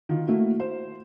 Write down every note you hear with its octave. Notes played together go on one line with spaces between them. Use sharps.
D#3 F4
A3 A#3 E4 F#4
C5